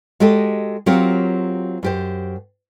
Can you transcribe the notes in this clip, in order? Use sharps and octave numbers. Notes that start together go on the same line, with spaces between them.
G#3 F#4 G4 A4 D#5
F#3 C4 F4 G4 A#4 C#5
F#2 G4 C5